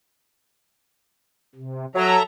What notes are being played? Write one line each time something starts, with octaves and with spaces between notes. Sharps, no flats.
C3
F#3 A4 E5 A#5